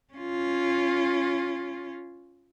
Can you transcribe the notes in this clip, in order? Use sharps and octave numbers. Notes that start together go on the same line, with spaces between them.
C#4 F4